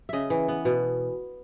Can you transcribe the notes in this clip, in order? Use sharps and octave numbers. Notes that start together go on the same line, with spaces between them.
C#3 D#5 E5
E3
B3
B2